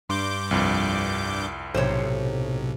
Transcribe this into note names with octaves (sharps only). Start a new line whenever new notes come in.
G2 C6 D6 G6
C2 F2
B1 A2 C3 C5 C#5